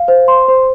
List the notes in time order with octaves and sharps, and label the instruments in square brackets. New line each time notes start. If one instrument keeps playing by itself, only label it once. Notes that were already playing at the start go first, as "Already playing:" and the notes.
Already playing: [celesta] F5
C5
C6
C5